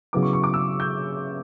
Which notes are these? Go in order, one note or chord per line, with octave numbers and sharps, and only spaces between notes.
C#3 F#3 B3 E4 D6
C#6
C#6
D6
E6
G6